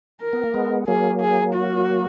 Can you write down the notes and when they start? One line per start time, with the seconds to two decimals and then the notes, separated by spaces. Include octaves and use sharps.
0.22 A#4
0.33 B3
0.44 A#3
0.54 G#3 B3
0.88 F#3 A#3 G#4
1.20 G#4
1.54 F#4